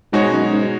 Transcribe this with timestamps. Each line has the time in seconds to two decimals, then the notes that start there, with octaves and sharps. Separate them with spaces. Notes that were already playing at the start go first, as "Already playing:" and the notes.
0.12 G#2 B2 G#3 D#4 F#4 C#5
0.32 F#2
0.52 G#2